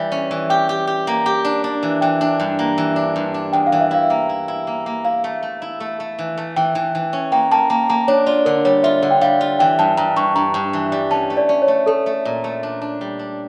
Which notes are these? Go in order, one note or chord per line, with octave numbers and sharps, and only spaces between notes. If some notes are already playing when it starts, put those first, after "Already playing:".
Already playing: E3 G3
C#4
E3
G4 G5
G4
G4
A#3
G4
D4
D4
E3
E3 G5
D4
G2
A#3
E3
D4
G2
D4
E2 G5
F5
E3
E5
E4 F5
A#3
E4
E4
A#3
A#3
E4 F5
A3
A3
E4
A3
A3
E3
A3
E3 G5
E3
E3
C#4
A#3 G5
A#3 A5
A#3 A#5
A#3 A#5
D4 C#5
F4 D5
D3 A#4
G3 C#5
F4 E5
D3
G5
G3 F5
F4
E3 G5
G2 A5
G2 A#5
G2 C#6
G2 A#5
G2
E3
G3
C#4 A5
A3
D5
C#4
C#5
A3
A3 A4
A3
A#2
A3
D4
D4
G3
D4